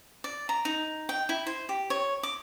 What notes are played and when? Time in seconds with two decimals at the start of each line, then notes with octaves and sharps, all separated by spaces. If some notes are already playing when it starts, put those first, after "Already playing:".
0.24 D5
0.49 A#5
0.65 D#4
1.09 G5
1.29 E4
1.47 C5
1.69 G4
1.90 C#5
2.23 D6